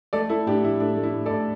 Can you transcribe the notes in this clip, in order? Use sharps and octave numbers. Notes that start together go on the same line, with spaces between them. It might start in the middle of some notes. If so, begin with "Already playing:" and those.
A3 A4 D5
A3 E4 A4
A2 D4 G4
A2 E4
A3 D4
A3
E4
A2
A4 D5
A2